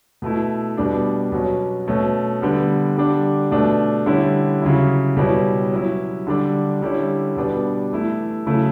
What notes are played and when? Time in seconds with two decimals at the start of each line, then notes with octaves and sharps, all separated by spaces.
0.22 B2 A3 E4
0.77 B2 G3 B3 D4
1.32 B2 F#3 C#4
1.87 B2 A3 C#4
2.42 D3 G3 B3
2.97 D3 G3 D4
3.51 B2 A3 D4
4.06 D3 G3 C#4 E4
4.62 C#3 F#3 C#4 E4
5.17 B2 G3 C#4 E4
5.72 F#3 C#4 E4
6.27 D3 G3 D4
6.82 D3 G3 C#4 E4
7.36 B2 G3 B3 D4
7.92 E3 A3 E4
8.46 C#3 F#3 A3 E4